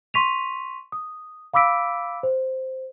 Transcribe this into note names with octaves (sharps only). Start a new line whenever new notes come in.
C6 C#6 B6 D#7 F7
D#6
F5 B5 D6 E6 B6 D7
C5